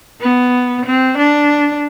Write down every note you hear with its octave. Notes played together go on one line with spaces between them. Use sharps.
B3
C4
D4